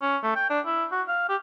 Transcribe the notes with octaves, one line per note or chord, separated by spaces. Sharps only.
C#4
A3
G5
D4
E4
F#4
F5
G4